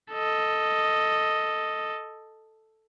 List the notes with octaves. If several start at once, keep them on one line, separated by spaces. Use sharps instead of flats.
A4 D#5